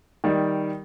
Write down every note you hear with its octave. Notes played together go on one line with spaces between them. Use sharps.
D#3 G3